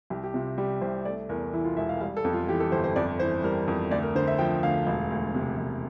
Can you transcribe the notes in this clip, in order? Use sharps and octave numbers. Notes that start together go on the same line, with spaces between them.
C2 G4
G4
C3 F4
G3 G4
C2 C5
A3 D5
E2 A#4
E3 E4
F4
E1 E5
F5
G3 F5
A4
F2
F4
E3 G4
A4
G1 C5
C5
F2 D5
E3 C5
G3 A#4
F2
D2 D5
A#4
D3 C5
E5
F3 G5
D2 F5
E1
D2
C3
E1